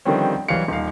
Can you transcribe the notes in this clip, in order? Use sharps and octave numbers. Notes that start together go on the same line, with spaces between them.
D3 D#3 F3 G3 C4 C#4
B1 E3 G3 C#5 F5 C#7
D#1 D#4 F5